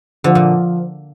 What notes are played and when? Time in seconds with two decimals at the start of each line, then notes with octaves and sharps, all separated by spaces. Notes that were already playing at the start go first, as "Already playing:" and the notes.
0.24 D3 F3
0.35 A#2